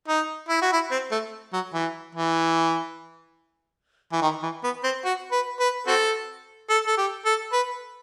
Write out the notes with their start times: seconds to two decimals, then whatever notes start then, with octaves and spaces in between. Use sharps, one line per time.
0.08 D#4
0.49 E4
0.62 F#4
0.73 E4
0.91 C4
1.12 A3
1.53 F#3
1.74 E3
2.15 E3
4.12 E3
4.22 D#3
4.43 E3
4.64 B3
4.84 C4
5.04 F#4
5.32 B4
5.60 B4
5.87 C4 F#4 A4
6.70 A4
6.87 A4
6.98 G4
7.25 A4
7.53 B4